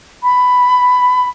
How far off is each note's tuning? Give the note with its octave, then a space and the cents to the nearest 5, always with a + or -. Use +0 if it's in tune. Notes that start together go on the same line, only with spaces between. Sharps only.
B5 +10